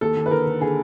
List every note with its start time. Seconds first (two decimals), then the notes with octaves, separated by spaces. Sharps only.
0.01 D#2 A4
0.17 D#2
0.26 B4
0.31 D3 A#4
0.46 D3
0.61 D3 G#4